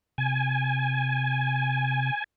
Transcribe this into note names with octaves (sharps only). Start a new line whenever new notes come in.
C3 G#5